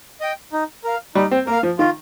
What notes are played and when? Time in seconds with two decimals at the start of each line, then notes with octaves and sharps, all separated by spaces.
0.21 D#5 G5
0.53 D#4
0.84 A#4 F5
1.15 G3 D#4
1.31 C4
1.47 A#3 A#4
1.51 F5
1.63 F3
1.79 D#3 F4